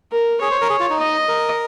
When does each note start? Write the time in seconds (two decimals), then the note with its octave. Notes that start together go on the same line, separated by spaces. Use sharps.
0.12 A#4
0.41 G#4 C#5
0.51 C5
0.61 A#4
0.70 G#4
0.80 F4
0.90 D#4
0.99 D#5
1.28 A#4